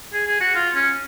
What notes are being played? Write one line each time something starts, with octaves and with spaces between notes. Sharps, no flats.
G#4
G#4
F#4
F4
C#4